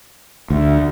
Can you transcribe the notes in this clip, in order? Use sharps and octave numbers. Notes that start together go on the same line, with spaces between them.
D2